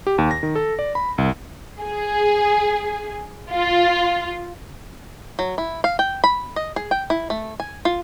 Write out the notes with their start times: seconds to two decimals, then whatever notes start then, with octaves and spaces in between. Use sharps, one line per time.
0.07 G4
0.18 D#2
0.31 A#6
0.43 D#3
0.55 A4
0.79 D5
0.95 B5
1.18 C2
1.81 G#4
3.52 F4
5.39 F#3
5.58 E4
5.84 F5
5.99 G5
6.24 B5
6.56 D#5
6.76 G#4
6.91 G5
7.10 E4
7.30 A3
7.60 G#5
7.85 F4